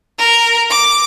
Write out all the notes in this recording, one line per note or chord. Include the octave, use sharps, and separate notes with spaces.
A#4
D6